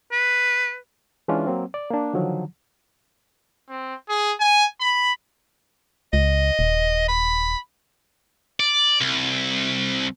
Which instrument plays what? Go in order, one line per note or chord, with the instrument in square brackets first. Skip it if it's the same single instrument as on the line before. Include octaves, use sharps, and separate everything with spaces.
[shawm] B4
[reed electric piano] E3 G#3 C#4 D4 F4
F#3 A#3 C4
D5
A#3 D4
D3 D#3 F3 F#3
[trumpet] C4
G#4
G#5
B5
[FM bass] C#2 [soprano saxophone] D#5
[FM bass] D#1
[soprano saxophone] B5
[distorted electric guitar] D5
C2